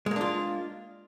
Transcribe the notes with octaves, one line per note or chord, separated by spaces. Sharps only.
G#3 A#3 D4 F4